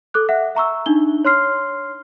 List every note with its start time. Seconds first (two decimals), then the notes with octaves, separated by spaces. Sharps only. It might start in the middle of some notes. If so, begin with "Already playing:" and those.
0.14 A4 D6 F#6
0.29 E5 F#5
0.55 E5 A#5 C#6 E6
0.86 D4 D#4 G7
1.25 C#5 C6 F6 C7